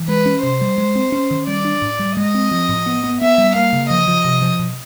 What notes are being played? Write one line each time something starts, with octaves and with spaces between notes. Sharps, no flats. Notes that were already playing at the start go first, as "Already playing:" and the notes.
Already playing: E3
G#3 B4
C#4
C3 C5
G3
G#3
C4
C#4
D#3
G3 D5
D4
A2
G3
G#3 D#5
C4
F3
A2
B3
B3
B3 E5
G3
A#3 F5
C#3
F3 D#5
F3
C3
F3
B2